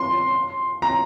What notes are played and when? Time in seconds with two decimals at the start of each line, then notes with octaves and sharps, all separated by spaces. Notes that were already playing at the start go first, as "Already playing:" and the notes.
Already playing: C6
0.82 A#5